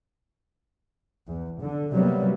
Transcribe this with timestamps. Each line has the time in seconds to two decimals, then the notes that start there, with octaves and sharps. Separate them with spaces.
1.26 E2
1.60 D3
1.94 C3 F#3 G3 A#3 B3